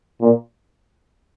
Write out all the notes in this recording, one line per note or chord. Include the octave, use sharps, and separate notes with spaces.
A#2